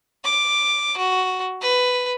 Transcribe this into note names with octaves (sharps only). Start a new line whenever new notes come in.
D6
F#4
B4